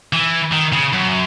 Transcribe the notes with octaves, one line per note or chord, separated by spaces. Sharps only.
E3
D#3
C#3
F#2